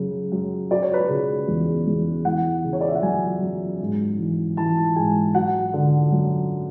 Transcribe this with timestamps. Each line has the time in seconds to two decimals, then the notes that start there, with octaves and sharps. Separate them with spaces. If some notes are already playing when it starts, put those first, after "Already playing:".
Already playing: F#2 C#3 F#3
0.32 F#2
0.71 F#3 D5
0.83 C#5
0.94 B4
1.06 C#3 C#5
1.48 E2
1.87 E2
2.25 E3 F#5
2.64 C#3
2.73 C#5
2.81 D5
2.88 E5
2.95 F#5
3.02 F#2 G#5
3.41 F#2
3.80 G#2
4.19 E3
4.57 E3 A5
4.96 G#2 G#5
5.34 F#3 F#5
5.73 D3
6.12 F#2